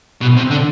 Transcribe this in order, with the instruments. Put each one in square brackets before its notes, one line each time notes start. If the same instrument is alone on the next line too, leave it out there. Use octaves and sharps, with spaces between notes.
[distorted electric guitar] B2
C3
D3